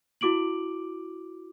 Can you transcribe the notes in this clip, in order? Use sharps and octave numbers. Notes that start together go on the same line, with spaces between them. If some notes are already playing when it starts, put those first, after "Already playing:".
E4 F#4 D6 D7 F#7